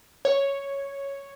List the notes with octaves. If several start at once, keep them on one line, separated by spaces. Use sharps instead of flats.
C#5